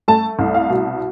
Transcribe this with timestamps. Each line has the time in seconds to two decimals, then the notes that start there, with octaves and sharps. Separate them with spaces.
0.08 A3 A5
0.39 C2
0.54 F5
0.70 B2